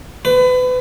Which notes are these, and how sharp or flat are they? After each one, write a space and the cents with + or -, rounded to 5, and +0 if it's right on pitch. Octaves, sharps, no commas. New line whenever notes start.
B4 +30